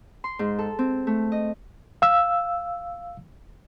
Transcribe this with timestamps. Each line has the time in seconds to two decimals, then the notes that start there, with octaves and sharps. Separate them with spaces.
0.24 C6
0.39 G#2
0.59 A4
0.79 C4
1.07 A3
1.32 D#5
2.02 F5 E6